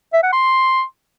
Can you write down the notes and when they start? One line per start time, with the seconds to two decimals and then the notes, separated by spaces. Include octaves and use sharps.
0.13 E5
0.23 F#5
0.32 C6